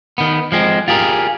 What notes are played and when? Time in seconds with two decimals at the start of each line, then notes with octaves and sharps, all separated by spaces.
0.18 D#3 B3
0.52 F3 G#3 C4
0.88 F4 G4 G#4 A#4